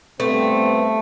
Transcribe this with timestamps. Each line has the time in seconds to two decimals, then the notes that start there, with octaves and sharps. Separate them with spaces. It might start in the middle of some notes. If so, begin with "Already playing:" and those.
0.20 G2 A3 B3 C4